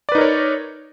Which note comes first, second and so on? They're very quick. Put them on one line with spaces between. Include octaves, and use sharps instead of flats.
D5 B4 D#4 A#4 C#5